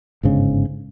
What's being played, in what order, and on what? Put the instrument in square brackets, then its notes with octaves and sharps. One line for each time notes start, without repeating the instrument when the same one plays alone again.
[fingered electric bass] G1 G#2 C#3